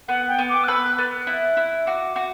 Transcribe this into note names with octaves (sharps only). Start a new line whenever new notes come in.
B3 F#5
G5
B3
D6
F#6
B4 E6
F#6
B3 A6
F#6
E4
E4
F#4 D6
F#4